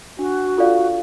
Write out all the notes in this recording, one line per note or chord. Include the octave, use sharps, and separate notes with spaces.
D4 F#4
F4 A4 D5 F5